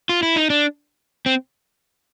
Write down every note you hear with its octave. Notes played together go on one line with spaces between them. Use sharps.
F4
E4
D#4
D4
C4